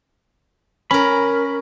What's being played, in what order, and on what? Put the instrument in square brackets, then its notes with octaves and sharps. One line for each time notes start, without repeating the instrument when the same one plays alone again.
[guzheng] C#4 A#4 [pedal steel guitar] B5